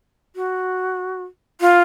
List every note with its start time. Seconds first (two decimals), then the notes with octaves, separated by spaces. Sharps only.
0.36 F#4
1.61 F4